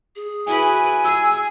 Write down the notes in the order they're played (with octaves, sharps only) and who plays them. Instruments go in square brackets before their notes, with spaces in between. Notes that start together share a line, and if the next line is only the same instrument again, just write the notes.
[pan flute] G#4
[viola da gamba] E4 F#4 B4 [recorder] G#5
[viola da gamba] G#4 [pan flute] E6